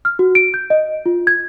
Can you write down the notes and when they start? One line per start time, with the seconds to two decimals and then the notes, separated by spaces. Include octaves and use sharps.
0.05 F6
0.19 F#4
0.35 D7
0.54 G6
0.70 D#5
1.06 F4
1.27 G#6